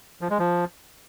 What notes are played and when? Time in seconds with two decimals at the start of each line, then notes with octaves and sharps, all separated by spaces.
0.21 F3
0.30 G#3
0.39 F3